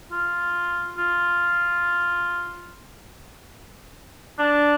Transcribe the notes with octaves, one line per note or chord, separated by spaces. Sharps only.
F4
F4
D4